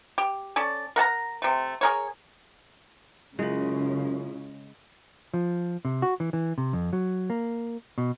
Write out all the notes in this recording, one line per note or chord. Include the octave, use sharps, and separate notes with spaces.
G4
C#4 A4 D5
A#4 F#5 A5 A#5
C3 A3
G#4 A#4 C#5
F#2 C#3 G#3 E4 F4
F3
C3
F#4
E3
E3
C3
F2
F#3
A#3
B2